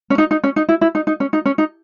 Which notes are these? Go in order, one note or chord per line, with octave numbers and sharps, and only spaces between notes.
C#4
D#4
D#4
C#4
D#4
E4
E4
D#4
D#4
C#4
D#4
C#4
D#4